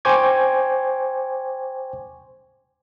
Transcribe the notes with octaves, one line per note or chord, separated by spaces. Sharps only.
C5 G5 G#5 C#6 D6 G#6